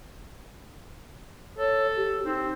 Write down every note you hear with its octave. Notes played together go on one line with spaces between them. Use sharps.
A4 C#5
G4
C4 D#4